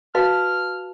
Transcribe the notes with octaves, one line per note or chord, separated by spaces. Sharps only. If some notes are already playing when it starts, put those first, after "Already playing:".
F#4 B4 F5 A5 F6